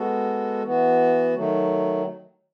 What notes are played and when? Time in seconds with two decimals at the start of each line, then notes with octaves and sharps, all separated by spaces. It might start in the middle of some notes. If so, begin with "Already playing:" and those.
Already playing: G#3 B3 F#4 A4
0.63 E3 B3 F#4
1.35 D#3 F#3 A3